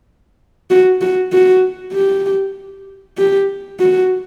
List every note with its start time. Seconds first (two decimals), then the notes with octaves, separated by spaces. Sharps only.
0.70 F#4
1.01 F#4
1.33 F#4
1.94 G4
3.18 G4
3.80 F#4